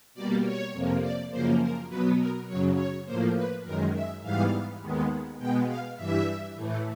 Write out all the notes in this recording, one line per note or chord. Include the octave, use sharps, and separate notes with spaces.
B2 G3 A#3 D5
C#5
F2 C3 F3 A#3
D5
F#2 C#3 F3 A#3 C5
A#4
B2 F#3 B3 B4
A#4
F#2 C#3 F#3 C#5
C#5
A2 F3 A#3 C5
B4
F#2 D#3 G#3 A#4
E5
G#2 E3 G3 B3 F5
D#2 D#3 G#3 B3
B2 G#3 B3 G5
F5
G2 E3 G3 E5
A2 E3 A3